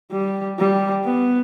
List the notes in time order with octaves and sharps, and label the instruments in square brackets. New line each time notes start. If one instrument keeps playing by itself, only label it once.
[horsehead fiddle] G3
G3
B3